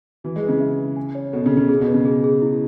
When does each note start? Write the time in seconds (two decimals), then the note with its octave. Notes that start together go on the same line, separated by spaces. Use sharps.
0.24 E3 F#4
0.36 G#3
0.43 B4
0.49 C#3
0.60 E5
0.79 B4
0.96 G#5
1.15 C#5
1.33 B2 A4
1.46 C#3
1.51 A4
1.57 C#3
1.69 G#4
1.81 B2
1.88 B4
1.94 C#3
2.05 G#4
2.24 G#4
2.42 E4